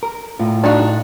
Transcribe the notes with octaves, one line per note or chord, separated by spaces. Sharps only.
A#4
A2 F4
D4 D#4 F#4